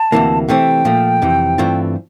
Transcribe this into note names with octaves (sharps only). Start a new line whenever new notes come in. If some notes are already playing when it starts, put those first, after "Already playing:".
Already playing: A5
D2 C3 E3 A#3
C3 E3 A3 C4 G5
A#2 F3 A3
F2 C3 E3
G2 E3 A3 C4 F4